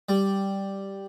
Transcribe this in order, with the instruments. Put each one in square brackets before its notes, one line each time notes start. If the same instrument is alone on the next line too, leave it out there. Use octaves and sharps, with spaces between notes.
[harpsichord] G3